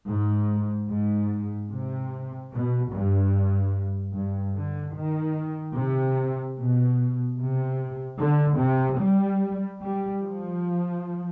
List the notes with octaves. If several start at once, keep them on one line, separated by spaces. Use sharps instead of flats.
G#2
G#2
C3
B2
G2
G2
D3
D#3
C3
B2
C3
D3
C3
G3
G3
F3